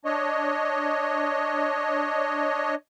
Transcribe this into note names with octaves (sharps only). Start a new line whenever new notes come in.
D4 C#5 D#5